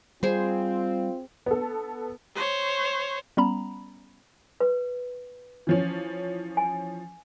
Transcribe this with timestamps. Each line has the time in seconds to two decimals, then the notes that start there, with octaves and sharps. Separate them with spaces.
0.23 G3 C4 F4 G#4 C5
1.46 B3 A4
2.35 C5 C#5
3.37 G3 B3 C#4 A#5 B5
4.60 B4
5.67 E3 F3 C#4
6.57 G#5